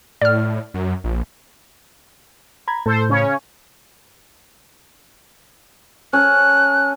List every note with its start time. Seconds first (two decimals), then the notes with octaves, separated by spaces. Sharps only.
0.21 A2 D5 F6
0.74 F#2
1.04 A#1
2.68 A#5 B5 G#6
2.86 A2 A4 C5
3.09 C#3 C#4 C#5
6.13 C#4 A4 F#6